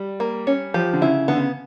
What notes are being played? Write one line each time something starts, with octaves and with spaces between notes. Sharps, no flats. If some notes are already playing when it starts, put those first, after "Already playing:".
Already playing: G3
A#3
C#4
F3 G4
D3
C#3 E4
D3 B3
C#3